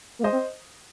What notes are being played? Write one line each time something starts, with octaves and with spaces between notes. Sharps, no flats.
A#3
G#3 C5 D#5
C4